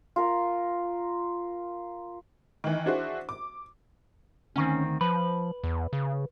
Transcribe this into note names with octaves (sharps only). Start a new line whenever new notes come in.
F4 A#4
D#3 E3
D4 E4 F#4 G#4 C5
D6
D2 D#3 C4 C#4
F3 B4
E2
C#3